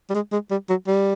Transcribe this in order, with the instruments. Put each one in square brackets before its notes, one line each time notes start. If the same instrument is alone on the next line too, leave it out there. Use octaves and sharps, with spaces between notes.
[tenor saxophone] G3
G#3
G#3
G3
F#3
G3